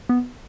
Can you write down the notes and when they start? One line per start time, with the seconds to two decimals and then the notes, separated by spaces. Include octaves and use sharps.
0.09 B3